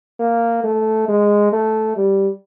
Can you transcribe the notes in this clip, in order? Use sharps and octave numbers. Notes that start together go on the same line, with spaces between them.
A#3
A3
G#3
A3
G3